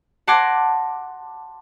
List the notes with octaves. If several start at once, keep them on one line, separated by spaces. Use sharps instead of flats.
F#5 A5 C6 D6 G#6 A#6